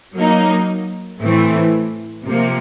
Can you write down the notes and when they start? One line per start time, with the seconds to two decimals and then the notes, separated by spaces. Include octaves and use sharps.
0.15 F#3 A#3 D#4
1.20 A2 E3 A3 C4
2.25 C3 F3 A#3